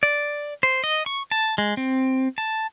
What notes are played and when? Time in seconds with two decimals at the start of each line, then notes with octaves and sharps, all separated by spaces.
0.03 D5
0.63 C5
0.84 D#5
1.06 C#6
1.31 A5
1.58 G#3
1.77 C4
2.38 A5